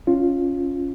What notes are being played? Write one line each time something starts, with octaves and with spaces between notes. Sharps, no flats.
C#4 F4